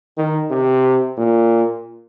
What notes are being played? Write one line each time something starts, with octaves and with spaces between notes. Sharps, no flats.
D#3
C3
A#2